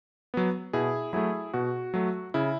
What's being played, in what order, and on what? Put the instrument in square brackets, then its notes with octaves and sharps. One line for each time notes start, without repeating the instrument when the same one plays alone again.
[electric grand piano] F#3 B3
B2 E4 G#4
F#3 A3 E4 G#4
B2 F#4
F#3 A3
C#3 E4